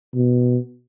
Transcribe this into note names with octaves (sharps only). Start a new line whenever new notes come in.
B2